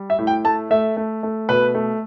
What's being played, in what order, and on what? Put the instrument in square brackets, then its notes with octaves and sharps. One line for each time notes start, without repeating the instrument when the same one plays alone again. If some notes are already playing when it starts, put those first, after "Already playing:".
Already playing: [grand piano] G3
E5
A2
G5
A3 A5
A3 E5
A3
A3
B2 B4
A3